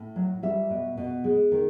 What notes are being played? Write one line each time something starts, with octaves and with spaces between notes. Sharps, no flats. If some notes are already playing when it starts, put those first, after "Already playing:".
Already playing: A2
F#3
G3 E5
B2
B2
G#3
D#3